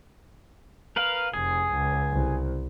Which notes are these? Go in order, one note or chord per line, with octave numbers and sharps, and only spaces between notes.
A#4 B4 F5
F1 G#4
C#2
C2